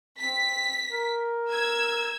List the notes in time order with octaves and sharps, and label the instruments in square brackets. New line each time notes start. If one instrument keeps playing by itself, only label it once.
[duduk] C4 [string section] B6
[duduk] A#4
[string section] E6 G#6